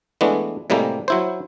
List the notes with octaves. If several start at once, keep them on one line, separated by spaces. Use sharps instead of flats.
E3 G#3 A3 B3 D4
A2 C3 G3 G#3 A#3
F#3 E4 C5